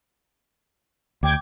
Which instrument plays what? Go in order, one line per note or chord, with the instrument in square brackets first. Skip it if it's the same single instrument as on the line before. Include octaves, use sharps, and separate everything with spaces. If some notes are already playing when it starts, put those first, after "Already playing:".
[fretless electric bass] D2 [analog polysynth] G5 D6 G#6